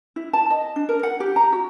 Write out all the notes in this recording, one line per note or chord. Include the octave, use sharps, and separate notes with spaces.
E4
A5
D#5
D4
A#4
F#5
G4
A#5
F#4